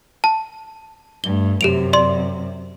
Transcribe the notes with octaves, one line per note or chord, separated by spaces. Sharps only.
A5
G2 A3 G7
F#2 C3 G4 D7 F7
D5 C6